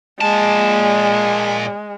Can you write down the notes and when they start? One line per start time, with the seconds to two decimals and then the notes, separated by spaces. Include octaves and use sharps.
0.21 A#2 G#3 A5